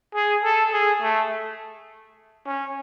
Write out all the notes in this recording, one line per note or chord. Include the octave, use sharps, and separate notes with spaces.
G#4
A4
G#4
A3
C#4